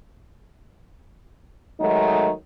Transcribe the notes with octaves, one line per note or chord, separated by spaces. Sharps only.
D#3 F#3 G#3 A3 D#4